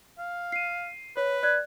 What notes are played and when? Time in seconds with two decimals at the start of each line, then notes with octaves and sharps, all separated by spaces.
0.18 F5
0.52 C7 D#7
1.17 B4 C#5
1.43 D5 F#6 G#6